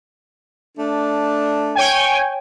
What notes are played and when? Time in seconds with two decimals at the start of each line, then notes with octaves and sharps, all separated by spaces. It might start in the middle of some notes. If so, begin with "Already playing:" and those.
0.77 A3 D4
1.75 C#5 G5 G#5